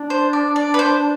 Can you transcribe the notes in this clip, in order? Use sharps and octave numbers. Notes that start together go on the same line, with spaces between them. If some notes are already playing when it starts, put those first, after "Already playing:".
Already playing: D4
C5
D5
D5
B4
C5